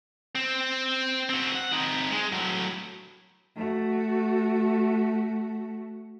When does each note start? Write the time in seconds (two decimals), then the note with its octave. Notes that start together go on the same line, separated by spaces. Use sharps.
0.35 C4
1.29 C4 F#4
1.55 F#5
1.72 C4 D#4
2.12 G#3
2.32 A2 F#3
3.56 A3 F#4